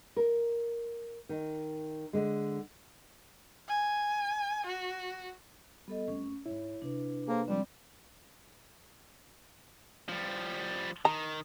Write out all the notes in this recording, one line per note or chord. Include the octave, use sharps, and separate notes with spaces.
A#4
D#3
D3 G#3
G#5
F#4
G3 B3 A4 D#5
F2 A3 C#4
G#2 G#3 E4 C#5
C3 D4 B4
A#3 G#4 A4 C5
F3 G3 G#3 C4 D4
F3 G3
D#3 A#5